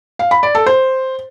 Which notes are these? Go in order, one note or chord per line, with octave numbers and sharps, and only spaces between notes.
F5
B5
D5
A4
C5